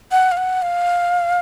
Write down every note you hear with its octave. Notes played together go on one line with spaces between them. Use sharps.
F#5
F5
F#5
F5